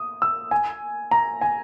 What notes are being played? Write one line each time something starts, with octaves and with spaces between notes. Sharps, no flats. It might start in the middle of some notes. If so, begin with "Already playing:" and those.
Already playing: D#6
E6
G#5
A#5
G#5